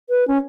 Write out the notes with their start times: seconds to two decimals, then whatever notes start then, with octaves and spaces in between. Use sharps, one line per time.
0.10 B4
0.28 C#4